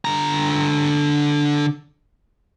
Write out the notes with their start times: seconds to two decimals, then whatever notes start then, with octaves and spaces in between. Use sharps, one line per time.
0.05 D3 A#5